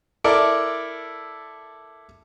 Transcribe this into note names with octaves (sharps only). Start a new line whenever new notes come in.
E4 A4 A#4 D5